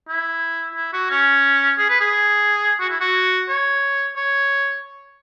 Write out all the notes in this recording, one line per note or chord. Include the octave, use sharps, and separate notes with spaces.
E4
E4
F#4
C#4
G#4
B4
G#4
F#4
E4
F#4
C#5
C#5